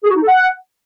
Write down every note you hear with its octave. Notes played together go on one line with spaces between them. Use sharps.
G#4
F#4
D#4
A4
F#5